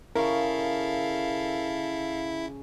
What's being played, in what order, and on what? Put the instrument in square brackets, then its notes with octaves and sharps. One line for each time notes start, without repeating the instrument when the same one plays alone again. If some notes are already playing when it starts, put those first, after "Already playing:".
[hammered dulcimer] C#3 C#6 [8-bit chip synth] E4 [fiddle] A4 F5 [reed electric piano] A#4